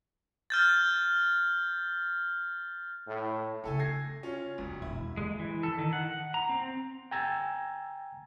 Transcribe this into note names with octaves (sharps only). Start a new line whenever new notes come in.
F6 G6 A6
A2
G#2 C#3 A3 A4 G#5
D4 G#6 A#6 C7
C#4 F4
E1 F#2 D#3
E1 F#2 E4
G#3
E3
A4
D#3
F#5
A#5
C4
G5 G#5 A#5 E6 G#6 A6